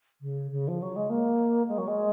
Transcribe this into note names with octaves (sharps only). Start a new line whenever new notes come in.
C#3
C#3
F3
F#3
G#3
A#3
G#3
F#3
G#3